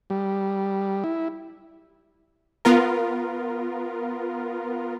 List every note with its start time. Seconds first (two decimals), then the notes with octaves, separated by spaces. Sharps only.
0.10 G3
1.04 E4
2.65 B3 F4 A#4